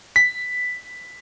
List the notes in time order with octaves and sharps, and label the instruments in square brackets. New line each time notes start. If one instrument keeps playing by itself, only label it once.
[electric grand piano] B6